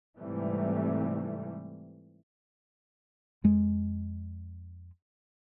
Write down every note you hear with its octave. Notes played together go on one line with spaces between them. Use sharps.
G#2 C3 E3 G3 A3
F2 G#3